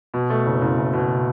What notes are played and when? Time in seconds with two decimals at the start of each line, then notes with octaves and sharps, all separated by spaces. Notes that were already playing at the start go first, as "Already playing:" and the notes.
0.14 B2
0.30 A3
0.46 F#1
0.61 F#1
0.77 F#1
0.93 B2